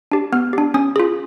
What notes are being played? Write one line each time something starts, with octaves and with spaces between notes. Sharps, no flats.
D4 G4
B3 F6
D4 G4
C#4 D#6
F4 G#4